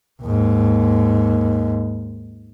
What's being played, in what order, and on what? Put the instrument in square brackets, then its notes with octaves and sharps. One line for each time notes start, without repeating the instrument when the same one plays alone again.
[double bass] D#2 G#2